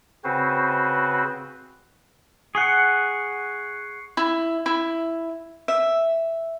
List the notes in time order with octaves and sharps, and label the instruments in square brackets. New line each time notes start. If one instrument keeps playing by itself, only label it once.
[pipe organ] C#3 C4 F#4 B4 C5
[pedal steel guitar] G#4 F#5 [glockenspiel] C#6 C7 C#7
[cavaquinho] E4
E4
E5